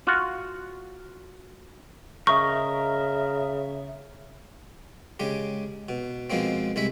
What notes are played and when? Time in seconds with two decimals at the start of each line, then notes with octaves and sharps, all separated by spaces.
0.07 F4 F#4
2.27 C#3 A#4 D#5 E5 C#6
5.20 C#3 G#3 G4
5.89 B2
6.30 B2 F3 G#3 A#3 C4
6.76 C2 G#3 E4 E5